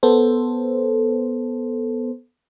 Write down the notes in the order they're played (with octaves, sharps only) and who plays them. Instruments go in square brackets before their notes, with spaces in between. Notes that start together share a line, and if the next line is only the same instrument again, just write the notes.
[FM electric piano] B3 A4 C5